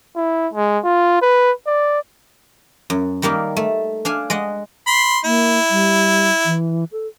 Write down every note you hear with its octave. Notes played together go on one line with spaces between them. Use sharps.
E4
G#3
F4
B4
D5
F#2
D#3 G3 A#3 D#4
A3
D4 F5 G#5
G#3 D#5 F#5
B5 C6
A#3 E4
G3
E3
A4